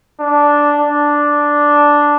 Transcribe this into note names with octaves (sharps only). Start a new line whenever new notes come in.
D4
D4